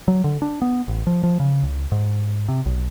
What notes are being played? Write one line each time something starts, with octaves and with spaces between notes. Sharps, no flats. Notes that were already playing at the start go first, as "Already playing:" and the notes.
F#3
D3
D4
B3
A1
F3
F3
C#3
C#2
G#2
C3
B1